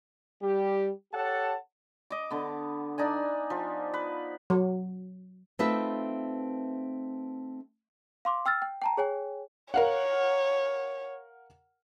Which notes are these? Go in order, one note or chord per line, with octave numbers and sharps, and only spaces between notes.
G3 G4
G4 A4 C#5 F#5 A5
D#5 D6
D3 B3
D4 D#4 D5 G#5
F3
B4
F#3
A3 C4 D#4 F4 B4 E5
F5 C6 D6
G5 E6 F6 A6
G5
G5 A5 A#5
G#4 C#5 G5 G#5
A#4 C#5 F5 F#5